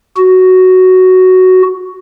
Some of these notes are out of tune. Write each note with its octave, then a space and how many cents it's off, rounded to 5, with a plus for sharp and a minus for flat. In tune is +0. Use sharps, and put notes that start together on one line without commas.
F#4 +5